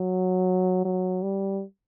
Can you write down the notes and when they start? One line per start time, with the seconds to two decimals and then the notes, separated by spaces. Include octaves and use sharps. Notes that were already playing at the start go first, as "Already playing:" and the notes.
Already playing: F#3
0.84 F#3
1.22 G3